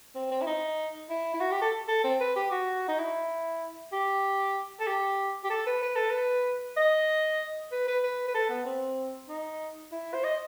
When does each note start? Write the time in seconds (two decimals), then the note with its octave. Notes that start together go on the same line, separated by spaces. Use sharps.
0.15 C4
0.31 C4
0.42 E4
0.47 D#4
1.10 E4
1.34 E4
1.41 F#4
1.51 G4
1.62 A4
1.88 A4
2.04 C4
2.20 B4
2.36 G4
2.51 F#4
2.88 D#4
2.99 E4
3.93 G4
4.80 A4
4.87 G4
5.44 G4
5.50 A4
5.67 B4
5.83 B4
5.96 A4
6.10 B4
6.77 D#5
7.72 B4
7.88 B4
8.04 B4
8.28 B4
8.35 A4
8.50 B3
8.65 C4
9.29 D#4
9.92 E4
10.14 C5
10.24 D#5